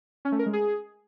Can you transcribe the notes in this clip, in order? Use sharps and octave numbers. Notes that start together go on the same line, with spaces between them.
C#4
A3
A#4
G#3
G#4